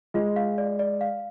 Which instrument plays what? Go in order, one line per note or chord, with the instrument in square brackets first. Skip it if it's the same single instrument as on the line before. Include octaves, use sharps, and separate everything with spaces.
[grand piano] G#3 [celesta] F4
[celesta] F5
D5
D5
F5